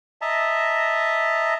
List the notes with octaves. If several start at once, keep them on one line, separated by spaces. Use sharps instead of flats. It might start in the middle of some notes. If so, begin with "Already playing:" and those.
D#5 E5 A5 A#5